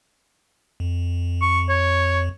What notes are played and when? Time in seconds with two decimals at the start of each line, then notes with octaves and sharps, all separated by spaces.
0.80 F2
1.42 C#6
1.69 C#5